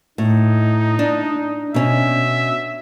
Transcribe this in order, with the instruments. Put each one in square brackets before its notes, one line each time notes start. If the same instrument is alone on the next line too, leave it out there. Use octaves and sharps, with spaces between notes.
[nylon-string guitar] A2 [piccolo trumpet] D#4
[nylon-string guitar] D4
[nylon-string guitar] B2 C#4 [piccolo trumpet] E5